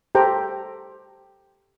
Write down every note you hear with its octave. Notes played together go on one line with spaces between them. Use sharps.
G4 A4 C5 G5 A#5